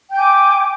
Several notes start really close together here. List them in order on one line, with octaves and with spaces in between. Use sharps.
G5 G6 G#5 D6